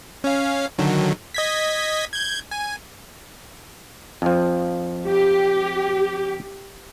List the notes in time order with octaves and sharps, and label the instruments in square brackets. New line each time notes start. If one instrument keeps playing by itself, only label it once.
[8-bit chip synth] C#4 F5
D3 D#3 F#3
D#5 G#6 B6
G6 G#6
G#5
[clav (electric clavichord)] F2 F3
[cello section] G4